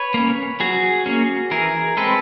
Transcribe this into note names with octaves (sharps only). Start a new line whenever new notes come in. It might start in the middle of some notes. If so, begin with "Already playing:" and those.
Already playing: B4 C#5
A#3 C#4
F#3 F#4 G#4
A#3 C#4
E3 G#4 A#4
G#3 C4 A4 B4